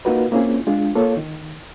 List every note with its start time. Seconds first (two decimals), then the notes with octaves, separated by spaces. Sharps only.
0.05 A#3 D#4 F4 F#4 A#4 B4
0.32 A#3 C4 C#4 E4 F4 G#4
0.67 G#3 D4 F4 G#4
0.95 A#3 F4 A4 C#5
1.17 D#3